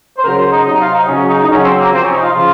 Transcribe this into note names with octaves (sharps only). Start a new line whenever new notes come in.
C5
C#3 F#3 A#4
C5
D#4
C3 F#3 D#4
F4
D#4
C#3 F#3 C#4
D#4
D#4
C#3 F#3 C#4
C4
A#3
C3 F3 C4
C#4
D#4
F4
C#3 F3 F4